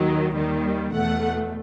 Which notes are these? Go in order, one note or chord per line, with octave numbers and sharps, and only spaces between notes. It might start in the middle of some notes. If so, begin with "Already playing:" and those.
Already playing: D#2 D#3 F#3
D#2 D#3 G3
E2 B2 A3 F#5